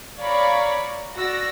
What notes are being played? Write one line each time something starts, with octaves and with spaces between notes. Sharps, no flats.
C#5 D5 F5 A#5 B5 C#6
F#4 D5 E6 A#6